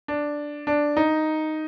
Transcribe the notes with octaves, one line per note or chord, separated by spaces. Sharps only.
D4
D4
D#4